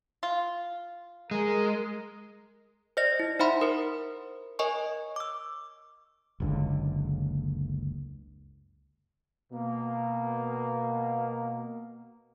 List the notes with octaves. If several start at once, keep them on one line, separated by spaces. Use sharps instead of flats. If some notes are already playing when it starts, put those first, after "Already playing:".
F4
G#3 A#4
C5 D5 D#5 A#6
E4
D#4 C5 E5 F#5 B5 C6
A#4 C5
A#4 C#5 D#5 G#5 C#6
D6 E6
F#1 C#2 D3
B2 A#3